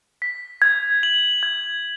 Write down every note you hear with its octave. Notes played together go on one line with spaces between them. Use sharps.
B6
G#6
F#7
G#6